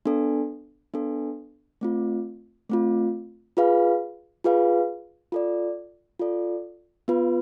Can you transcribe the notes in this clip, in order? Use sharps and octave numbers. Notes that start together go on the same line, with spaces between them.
B3 D4 A4
B3 D4 A4
A3 C4 F4
A3 C4 F4
F4 G#4 B4 F5
F4 G#4 B4 F5
F4 A4 D5
F4 A4 D5
B3 F4 B4